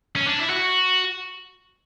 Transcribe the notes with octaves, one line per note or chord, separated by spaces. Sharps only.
C#4
D4
E4
F#4